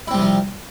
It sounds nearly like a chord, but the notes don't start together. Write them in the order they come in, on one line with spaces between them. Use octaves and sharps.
E4 C4 G3 C3 F3